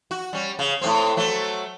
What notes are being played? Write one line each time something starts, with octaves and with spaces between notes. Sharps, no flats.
F#4
G3 C#4
C#3
A2 C3 C4
F#3 A3